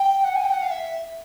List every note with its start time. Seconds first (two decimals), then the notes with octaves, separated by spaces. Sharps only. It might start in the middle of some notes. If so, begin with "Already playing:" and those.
Already playing: G5
0.24 F#5
0.35 G#5
0.44 G5
0.52 F#5
0.62 F5
0.71 E5